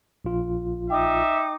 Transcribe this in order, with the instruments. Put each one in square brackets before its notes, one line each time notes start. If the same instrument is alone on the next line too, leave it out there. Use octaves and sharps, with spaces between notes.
[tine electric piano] A#1 F4
[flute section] D#4 D6 [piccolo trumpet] E5 [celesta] G5